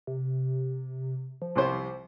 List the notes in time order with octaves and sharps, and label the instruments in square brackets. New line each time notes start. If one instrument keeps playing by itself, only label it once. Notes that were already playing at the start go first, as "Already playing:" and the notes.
[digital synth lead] C3
F3
[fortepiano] C2 C3 C5